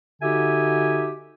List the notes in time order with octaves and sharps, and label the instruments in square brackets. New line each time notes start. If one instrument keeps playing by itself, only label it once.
[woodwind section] D3 D#4 F#4 G4 E5 G#5